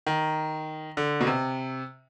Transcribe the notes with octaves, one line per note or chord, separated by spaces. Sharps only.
D#3
D3
B2
C3